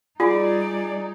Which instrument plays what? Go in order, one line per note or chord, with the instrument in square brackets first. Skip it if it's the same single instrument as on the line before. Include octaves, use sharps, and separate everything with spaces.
[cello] G3 D#4 [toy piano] F4 [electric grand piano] G#4 [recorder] D5